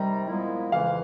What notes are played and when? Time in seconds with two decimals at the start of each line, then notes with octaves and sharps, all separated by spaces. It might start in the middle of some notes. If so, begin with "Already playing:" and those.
Already playing: C3 D#3 G3 A#5
0.28 A#2 F3 G#3 B3 E4
0.71 F2 C#3 E3 F5